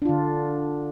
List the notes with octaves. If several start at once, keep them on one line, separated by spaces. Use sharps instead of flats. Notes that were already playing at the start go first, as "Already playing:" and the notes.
D3 D4 F4